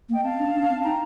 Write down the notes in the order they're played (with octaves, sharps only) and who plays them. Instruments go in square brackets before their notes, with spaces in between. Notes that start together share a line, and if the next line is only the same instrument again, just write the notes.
[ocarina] A#3
[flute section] D#5 G5
[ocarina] C4 [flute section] F5 A5
[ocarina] D4
D4
C4
[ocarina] D#4 [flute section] G5 A#5